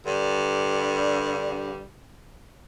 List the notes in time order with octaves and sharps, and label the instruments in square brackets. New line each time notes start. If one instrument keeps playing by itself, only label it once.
[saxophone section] G2 D3 G3